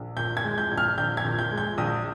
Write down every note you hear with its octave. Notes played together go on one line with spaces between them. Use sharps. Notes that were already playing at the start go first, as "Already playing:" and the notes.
Already playing: A#1
A#2 G6
G#6
G#3
G6
A#1
F6
A#1 G6
G#6
A#2
G6
G#3
G6
A#1 D#6